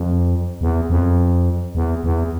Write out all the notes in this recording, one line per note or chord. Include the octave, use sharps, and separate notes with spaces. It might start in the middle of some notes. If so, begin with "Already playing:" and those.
Already playing: F2
E2
F2
E2
E2